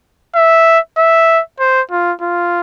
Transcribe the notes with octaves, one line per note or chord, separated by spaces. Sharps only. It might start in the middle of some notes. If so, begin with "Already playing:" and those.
E5
E5
C5
F4
F4